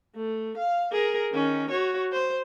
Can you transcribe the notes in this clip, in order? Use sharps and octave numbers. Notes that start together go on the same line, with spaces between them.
A3
F5
G#4 A#4
D#3 C#4
F#4 C#5
C5